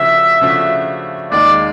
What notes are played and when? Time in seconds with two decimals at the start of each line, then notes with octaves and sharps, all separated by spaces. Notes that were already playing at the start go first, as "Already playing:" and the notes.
Already playing: C#3 F3 A3 D4 F#4 E5
0.41 C#3 F3 A3 D4 F#4
1.31 D#2 D#3 G#3 D5